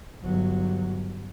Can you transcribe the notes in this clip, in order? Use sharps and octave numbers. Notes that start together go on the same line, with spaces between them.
G1 F#3